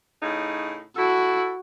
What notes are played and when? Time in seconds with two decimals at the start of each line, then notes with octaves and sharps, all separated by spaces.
0.21 A2 C#3 D#4
0.96 E4 F#4 A4